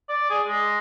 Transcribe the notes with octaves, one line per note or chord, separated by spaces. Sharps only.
D5
G#4
G#3